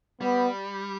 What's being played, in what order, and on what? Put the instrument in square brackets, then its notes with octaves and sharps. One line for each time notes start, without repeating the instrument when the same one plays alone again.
[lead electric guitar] G3 [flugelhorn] B3